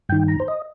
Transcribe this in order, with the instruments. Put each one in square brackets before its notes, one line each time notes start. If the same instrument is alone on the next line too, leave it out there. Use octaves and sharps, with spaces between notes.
[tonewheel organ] G2 D#3 G5
A#5
C5
D#5